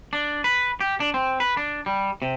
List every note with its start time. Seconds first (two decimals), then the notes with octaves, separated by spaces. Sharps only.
0.13 D4
0.44 B4
0.81 G4
1.00 D4
1.14 C4
1.40 B4
1.57 D4
1.86 G3
2.22 C3